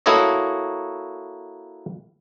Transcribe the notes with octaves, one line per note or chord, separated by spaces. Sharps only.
A#3 E4 F#4 A4 C#5 D#5